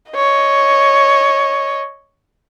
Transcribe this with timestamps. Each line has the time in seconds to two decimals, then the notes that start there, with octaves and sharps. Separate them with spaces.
0.12 C#5 D#5